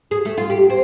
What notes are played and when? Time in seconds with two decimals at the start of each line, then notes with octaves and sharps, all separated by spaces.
0.11 G#4
0.25 A3
0.37 F4
0.50 G4
0.70 C4